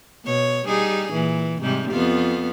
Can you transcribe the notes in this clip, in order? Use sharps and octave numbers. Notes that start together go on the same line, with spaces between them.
B2 C#5
G3 D#4 G#4
A#2 E3
G#2 C3 G3
F2 B3 F4